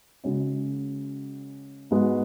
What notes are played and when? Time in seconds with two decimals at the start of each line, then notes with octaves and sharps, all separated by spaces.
0.24 C#3 G#3 C#4 F#4
1.91 G#2 G#3 B3 F#4